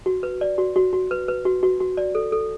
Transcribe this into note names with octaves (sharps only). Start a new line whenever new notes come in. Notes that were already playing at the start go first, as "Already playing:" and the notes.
F#4
B4
D5
F#4
F#4
F#4
B4
B4
F#4
F#4
F#4
D5
A4
A4